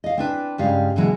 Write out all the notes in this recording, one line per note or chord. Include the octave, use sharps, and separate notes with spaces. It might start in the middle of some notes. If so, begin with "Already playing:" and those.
D#5 F5
C4 D4 B4
G2 C#3 G3 G#3 F5
B2 D3 E3 F#3 G#3